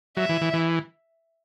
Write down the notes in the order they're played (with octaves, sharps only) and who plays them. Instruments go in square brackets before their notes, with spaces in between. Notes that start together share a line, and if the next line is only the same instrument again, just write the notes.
[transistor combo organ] F#3 [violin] E5
[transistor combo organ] E3
E3
E3